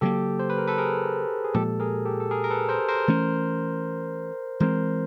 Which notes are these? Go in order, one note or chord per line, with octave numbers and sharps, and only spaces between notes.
C#3 F#3 A#3 G4 A4
C5
B4
A#4
A4 B4
G#4 A#4
G#4
A#2 F3 G#3 G4 A4
G#4 A#4
G4 A4
A4
G#4 A#4
A#4
A4 B4
A#4 C5
A#4 C5
E3 A3 C#4
E3 G#3 C4 A#4 C5